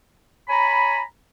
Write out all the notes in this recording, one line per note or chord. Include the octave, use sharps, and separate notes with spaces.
C#5 G#5 A#5 B5